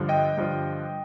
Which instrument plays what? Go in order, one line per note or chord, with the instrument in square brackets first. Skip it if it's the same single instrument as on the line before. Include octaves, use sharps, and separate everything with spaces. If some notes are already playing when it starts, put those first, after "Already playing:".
Already playing: [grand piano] G2 D3 F3
D#5 G5
G2 D3 F3